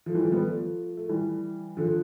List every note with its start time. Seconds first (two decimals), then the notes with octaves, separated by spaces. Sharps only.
0.06 F3 A3
0.15 E3 G3
0.24 F3 A3
0.32 G3 B3
0.41 F3 A3
0.97 A3
1.09 E3 G3
1.77 D3 F3